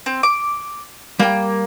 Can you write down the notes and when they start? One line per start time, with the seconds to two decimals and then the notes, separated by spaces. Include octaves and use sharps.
0.06 C4
0.23 D6
1.19 G3 A#3 G5